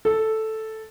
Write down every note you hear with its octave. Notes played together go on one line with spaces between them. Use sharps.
A4